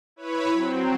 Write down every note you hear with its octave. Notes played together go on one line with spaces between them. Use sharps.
E4 B4 C#5 B5
F#3 C4